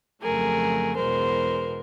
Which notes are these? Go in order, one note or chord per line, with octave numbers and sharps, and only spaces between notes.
F2 C#3 F#3 A3 G#4 A#4
E2 B2 G#3 A#4 C5